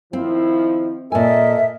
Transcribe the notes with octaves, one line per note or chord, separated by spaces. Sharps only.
D#3 F3 C4 E4
A#2 A4 A#4 D#5 E5 G#5